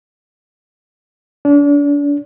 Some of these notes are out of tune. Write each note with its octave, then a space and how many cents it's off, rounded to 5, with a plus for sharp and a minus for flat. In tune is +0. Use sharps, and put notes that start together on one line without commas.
D4 -35